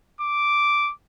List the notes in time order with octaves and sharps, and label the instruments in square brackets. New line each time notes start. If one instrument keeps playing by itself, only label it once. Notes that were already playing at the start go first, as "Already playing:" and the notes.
[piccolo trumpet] D6